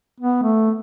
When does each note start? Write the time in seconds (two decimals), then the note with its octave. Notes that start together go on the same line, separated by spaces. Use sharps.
0.20 B3
0.43 A3